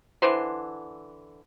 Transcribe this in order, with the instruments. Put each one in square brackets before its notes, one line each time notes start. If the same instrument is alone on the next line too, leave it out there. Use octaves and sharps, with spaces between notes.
[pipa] D3 E3 C5 C6